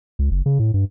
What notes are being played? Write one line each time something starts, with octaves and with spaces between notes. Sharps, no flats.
C#2
F#1
C#3
A2
G2